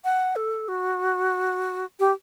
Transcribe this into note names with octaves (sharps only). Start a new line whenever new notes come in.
F#5
A4
F#4
G4